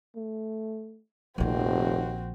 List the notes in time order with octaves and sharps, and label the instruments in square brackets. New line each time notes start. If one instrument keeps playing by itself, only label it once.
[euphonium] A3
[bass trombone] F1 [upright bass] A#1 D4 [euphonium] D#2 [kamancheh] C4 F#4